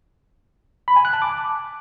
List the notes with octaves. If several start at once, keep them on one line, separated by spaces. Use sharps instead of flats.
B5
G#5
F#6
A5
D6